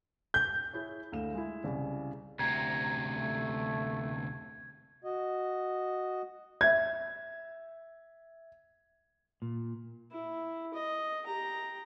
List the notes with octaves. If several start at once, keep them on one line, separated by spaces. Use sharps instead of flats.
G6
E4 G#4 C#5
D2 F5 E7
G#3 E4
C2 C#3
D2 C3 A#5 G#6
A3
F#4 D#5
E5 G#6
A#2
E4
D#5
G4 A#5